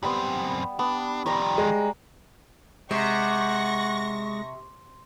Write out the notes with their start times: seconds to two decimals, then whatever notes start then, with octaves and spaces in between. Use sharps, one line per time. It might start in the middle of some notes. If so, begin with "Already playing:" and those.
0.03 F#2 G3 B3 C4
0.79 B3 D4
1.26 D#3 F3 G3 D5 A#5
1.58 G#3
2.91 C3 G#3 F#5 C#6 A#6